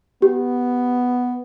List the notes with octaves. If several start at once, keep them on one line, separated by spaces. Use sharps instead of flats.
B3 G4